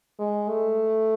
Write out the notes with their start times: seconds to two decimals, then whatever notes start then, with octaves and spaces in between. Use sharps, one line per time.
0.19 G#3
0.49 A3